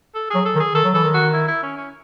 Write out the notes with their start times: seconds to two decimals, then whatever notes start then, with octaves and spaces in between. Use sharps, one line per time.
0.15 A4
0.30 F#3 G#4
0.45 A4
0.55 D#3
0.60 G#4
0.74 D#3 A4
0.84 F#3
0.94 E3 A4
1.03 D#3
1.14 F#4
1.34 E4
1.48 E4
1.63 C#4
1.78 C#4